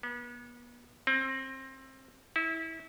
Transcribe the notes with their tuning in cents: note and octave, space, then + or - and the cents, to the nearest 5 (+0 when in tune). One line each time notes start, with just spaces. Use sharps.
B3 -35
C4 +25
E4 -25